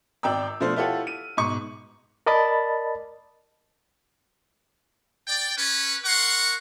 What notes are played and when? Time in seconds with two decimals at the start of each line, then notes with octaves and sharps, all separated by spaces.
0.23 G#1 D5 G5 A#5 E6
0.60 B2 F3 A3 D4 C5 F6
0.76 E4 F4 G4 A4 C#5 F#5
1.07 D#7
1.37 G#2 B2 C#6
2.27 A#4 D5 D#5 A5 B5 A6
5.28 D5 G5
5.58 C#4 B4
6.05 A#4 F#5 C6 C#6